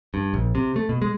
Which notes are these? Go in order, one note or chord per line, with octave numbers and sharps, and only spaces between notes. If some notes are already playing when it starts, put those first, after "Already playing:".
G2
A#1
C3
A3
B2
G#3